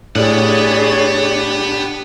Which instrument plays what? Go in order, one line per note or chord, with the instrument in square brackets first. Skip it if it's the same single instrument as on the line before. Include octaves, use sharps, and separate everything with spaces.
[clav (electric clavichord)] A2 [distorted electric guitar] B3 F#5 [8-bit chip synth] D4 G4 [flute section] G#4 C#5 D5